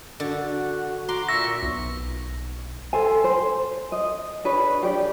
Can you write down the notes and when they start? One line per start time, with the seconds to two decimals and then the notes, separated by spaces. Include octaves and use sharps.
0.20 D3 F#4
1.09 F#4 A#5 C6 D6
1.29 A#2 E5 C#6 E6 A#6
1.63 B1
2.93 A4 C5 G#5
3.24 C5
3.92 D#5
4.45 D4 G#4 B4 C#5
4.83 G4 D5